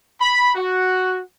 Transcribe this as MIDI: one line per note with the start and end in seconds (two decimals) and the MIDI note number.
0.21 0.52 83
0.55 1.20 66